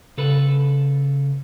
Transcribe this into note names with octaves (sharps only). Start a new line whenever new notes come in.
C#3 A4 B4